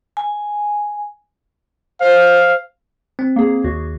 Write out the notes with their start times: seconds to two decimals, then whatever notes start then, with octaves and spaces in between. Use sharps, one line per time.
0.17 G#5
2.01 C5 F5
3.19 C4
3.36 A#3 G#4
3.64 D#2 F#4